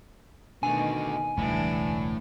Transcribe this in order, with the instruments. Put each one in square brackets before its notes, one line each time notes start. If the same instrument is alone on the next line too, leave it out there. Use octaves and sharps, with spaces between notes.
[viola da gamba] B2 D#3 [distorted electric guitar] D3 A3 [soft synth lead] G#5
[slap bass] E1 C#2 [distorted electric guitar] A2 [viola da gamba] E3 G3 D4